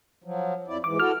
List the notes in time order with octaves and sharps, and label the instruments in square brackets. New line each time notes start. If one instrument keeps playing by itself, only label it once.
[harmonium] F3 F#3
F2 E4 D5
[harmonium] G#2 E3 [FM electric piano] D6
[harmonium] E4 F#4 A4 [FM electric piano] F6